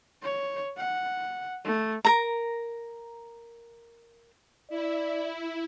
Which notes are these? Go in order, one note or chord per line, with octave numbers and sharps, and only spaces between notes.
C#5
F#5
A3
A#4 A#5
E4 D5